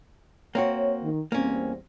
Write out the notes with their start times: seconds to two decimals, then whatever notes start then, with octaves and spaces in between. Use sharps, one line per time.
0.55 A#3 C4 F#4 C#5
1.02 D#3
1.32 E2 G3 A#3 C4 C#4